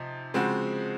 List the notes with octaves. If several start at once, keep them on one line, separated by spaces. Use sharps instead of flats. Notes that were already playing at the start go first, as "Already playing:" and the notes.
Already playing: C3 F3 D#4
C#3 F3 G#3 C4 F#4